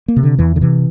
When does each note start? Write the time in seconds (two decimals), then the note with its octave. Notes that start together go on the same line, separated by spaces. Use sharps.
0.08 A#3
0.16 C3
0.23 D3
0.38 E2 E3
0.56 D3
0.61 C3 E3